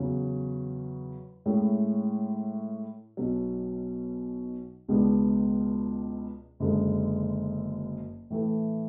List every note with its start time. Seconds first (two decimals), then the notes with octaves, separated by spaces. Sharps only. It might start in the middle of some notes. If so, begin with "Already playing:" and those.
Already playing: E2 C#3 F#3 C#4
1.46 A2 G#3 C#4 E4
3.17 B1 B2 F#3
4.88 C#2 B2 G#3 B3 D4
6.60 F#1 F#2 D3 G#3
8.30 A2 E3 A3